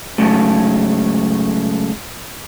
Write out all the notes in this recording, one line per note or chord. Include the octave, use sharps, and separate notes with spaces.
G#2 C#3 F#3 A3